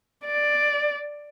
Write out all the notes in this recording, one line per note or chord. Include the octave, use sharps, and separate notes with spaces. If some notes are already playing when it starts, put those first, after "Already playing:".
D5